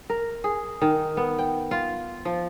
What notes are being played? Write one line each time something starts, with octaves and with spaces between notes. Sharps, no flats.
A#4
G#4
D#3
B3
G5
F4
F3